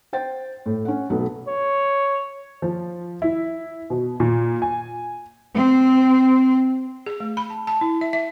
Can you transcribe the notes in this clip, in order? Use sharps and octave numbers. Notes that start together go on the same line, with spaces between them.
C5 G5 A6
A2
C#4 F#5
B1 F#3 A3 B3
C#5
F3
E4
B2
A#2
G#5
C4
G#4
A3
B5
A5
A5
E4
E5
E5